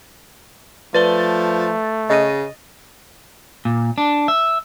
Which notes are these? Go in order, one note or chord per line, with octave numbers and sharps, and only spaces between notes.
F3 A3 B4 D5 A6 G7
C#3 D#5 A6 A#6 D#7
A#2
D4
E5